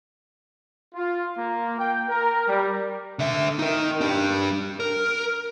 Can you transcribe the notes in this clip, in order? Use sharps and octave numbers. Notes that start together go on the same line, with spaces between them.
F4
A#3
G5
A#4
G3
D3 E5
D#4 A#4
D4 G4
A#4